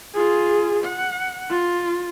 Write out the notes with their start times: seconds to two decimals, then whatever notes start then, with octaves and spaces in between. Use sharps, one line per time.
0.14 F4 G#4
0.85 F#5
1.50 F4